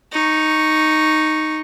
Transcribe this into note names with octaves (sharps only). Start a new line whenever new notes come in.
D#4 C#6